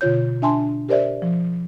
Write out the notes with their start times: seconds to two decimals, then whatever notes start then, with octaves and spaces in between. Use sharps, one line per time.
0.01 B2 D3 F4 C#5 G6
0.42 D4 E5 G#5 A5 C6
0.89 G4 A#4 C5 D5 E5
1.22 F3